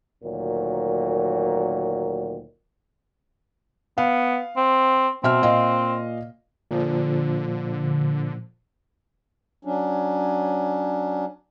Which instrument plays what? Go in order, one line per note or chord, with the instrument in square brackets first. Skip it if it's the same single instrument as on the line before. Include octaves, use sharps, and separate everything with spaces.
[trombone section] D2 A#2 D#3 F#3
[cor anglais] B3 [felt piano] F5
[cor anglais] C4
[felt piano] B2 E5 F6 [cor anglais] C4
[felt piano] A#2 D#5 F5
[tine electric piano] A#2 F3 [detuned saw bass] D3
[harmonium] F#3 C#4 D4